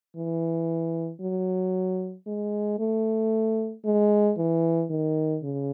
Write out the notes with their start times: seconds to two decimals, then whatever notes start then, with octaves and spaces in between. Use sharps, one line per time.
0.16 E3
1.21 F#3
2.26 G#3
2.79 A3
3.85 G#3
4.37 E3
4.90 D#3
5.43 C#3